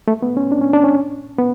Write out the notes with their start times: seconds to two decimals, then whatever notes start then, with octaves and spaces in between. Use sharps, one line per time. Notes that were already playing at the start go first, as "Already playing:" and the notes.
0.08 A3
0.22 B3
0.37 C#4
0.52 D4
0.61 C#4
0.73 D4
0.84 C#4
1.38 B3